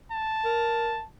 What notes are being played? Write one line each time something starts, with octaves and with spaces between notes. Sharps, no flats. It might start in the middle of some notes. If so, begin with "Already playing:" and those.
A5
A#4